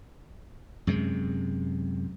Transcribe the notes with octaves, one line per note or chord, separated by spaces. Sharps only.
F#2 C3 G#3